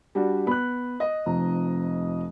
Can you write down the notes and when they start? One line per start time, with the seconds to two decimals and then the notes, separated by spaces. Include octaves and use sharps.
0.15 G3 D4 F#4
0.47 B3 B5 F#6
1.00 D#5
1.26 F1 F2 A#5